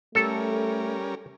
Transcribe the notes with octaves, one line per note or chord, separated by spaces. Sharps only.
G3 A3 C#4 A4 A#4